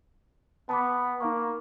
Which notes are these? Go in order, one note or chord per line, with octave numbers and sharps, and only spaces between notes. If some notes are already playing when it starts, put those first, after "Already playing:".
B3 A5 B5 D6
A#3 D#4 F5 C#6